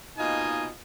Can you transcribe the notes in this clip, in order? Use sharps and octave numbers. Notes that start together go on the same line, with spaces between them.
B2 A#3 D#4 F4 D#5 G#5